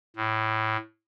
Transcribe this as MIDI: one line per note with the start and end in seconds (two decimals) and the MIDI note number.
0.16 0.77 45